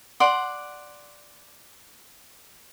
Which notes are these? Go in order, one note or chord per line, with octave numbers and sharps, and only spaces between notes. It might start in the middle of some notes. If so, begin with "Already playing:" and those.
D5 F#5 C6